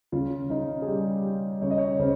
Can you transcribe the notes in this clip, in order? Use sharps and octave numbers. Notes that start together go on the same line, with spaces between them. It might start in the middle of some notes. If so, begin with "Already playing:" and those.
C#3 F4
C#3 D#4
G#4
G3 G4
G3
C#3 C#5
D#5
C#5
C#3 C5